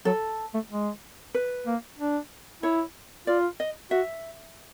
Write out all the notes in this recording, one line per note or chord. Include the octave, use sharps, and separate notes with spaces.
F#3 A4
A3
G#3
B4
A#3
D4
E4 C#5
F4 D5
D#5
F#4 E5